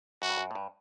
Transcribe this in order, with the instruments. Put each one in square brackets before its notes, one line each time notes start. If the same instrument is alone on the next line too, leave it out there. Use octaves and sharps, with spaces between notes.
[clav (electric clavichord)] F#2 [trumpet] F#4
[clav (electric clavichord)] G2
F#2
A2
G2